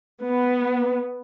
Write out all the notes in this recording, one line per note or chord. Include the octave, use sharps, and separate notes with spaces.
B3